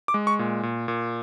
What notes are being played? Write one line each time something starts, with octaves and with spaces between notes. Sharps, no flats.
D6
G#3
C#6
A#2
A#2
A#2